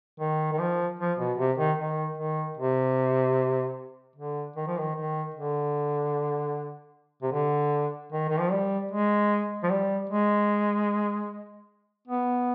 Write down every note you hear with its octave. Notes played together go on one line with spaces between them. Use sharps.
D#3
D#3
F3
F3
B2
C3
D#3
D#3
D#3
C3
D3
D#3
F3
D#3
D#3
D3
C3
D3
D#3
D#3
F3
G3
G#3
F3
G3
G#3
B3